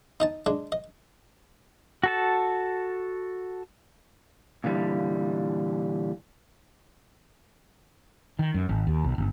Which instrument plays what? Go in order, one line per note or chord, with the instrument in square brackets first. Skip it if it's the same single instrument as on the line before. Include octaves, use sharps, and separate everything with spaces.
[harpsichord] D#4 D#5 A5
G#3 D4
D#5
[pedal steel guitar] F#4 A4 A5
[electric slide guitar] A#2 D3 E3 G3
[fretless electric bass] D#3
F#2
G#1
D#2
B1
G1